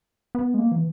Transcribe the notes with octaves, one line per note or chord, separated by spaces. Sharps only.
B3
G#3
A#3
E3